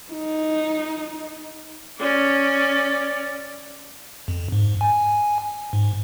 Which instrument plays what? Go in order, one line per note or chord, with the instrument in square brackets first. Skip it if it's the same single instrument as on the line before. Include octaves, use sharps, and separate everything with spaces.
[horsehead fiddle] D#4
[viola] C#4 D5
[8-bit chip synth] F2
G#2
G#5
G#2